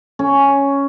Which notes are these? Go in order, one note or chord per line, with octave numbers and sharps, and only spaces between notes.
C#4